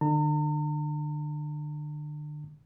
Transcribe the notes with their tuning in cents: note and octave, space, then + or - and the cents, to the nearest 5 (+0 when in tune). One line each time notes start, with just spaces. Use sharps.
D3 +35 A#5 -45